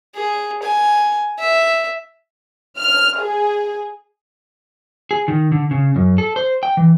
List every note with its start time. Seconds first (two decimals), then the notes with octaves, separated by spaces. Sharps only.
0.16 G#4
0.63 G#5
1.39 E5
2.79 F6
3.20 G#4
5.11 G#4
5.28 D#3
5.52 D3
5.71 C#3
5.96 F#2
6.18 A4
6.36 C5
6.63 G5
6.77 E3